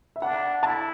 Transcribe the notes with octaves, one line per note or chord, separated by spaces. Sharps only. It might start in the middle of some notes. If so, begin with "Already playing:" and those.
E5
D4 F#5
E4 A5